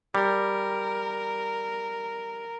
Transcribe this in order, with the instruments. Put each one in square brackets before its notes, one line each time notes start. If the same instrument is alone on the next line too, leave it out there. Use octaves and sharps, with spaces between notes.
[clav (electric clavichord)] G3 [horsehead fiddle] A#4